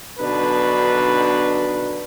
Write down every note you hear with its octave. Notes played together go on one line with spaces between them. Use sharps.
B1 B2 D3 D4 D#4 B4